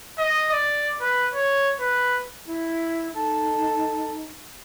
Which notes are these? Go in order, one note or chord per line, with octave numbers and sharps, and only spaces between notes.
D#5
D5
B4
C#5
B4
E4
D#4 A4